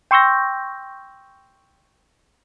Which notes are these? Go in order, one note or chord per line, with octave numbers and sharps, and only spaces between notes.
G5 C6 C#6 E6 G6 A#6